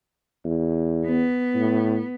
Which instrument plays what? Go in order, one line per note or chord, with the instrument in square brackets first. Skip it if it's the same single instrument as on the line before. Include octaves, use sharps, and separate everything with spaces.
[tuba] E2
[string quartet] B3
[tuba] A2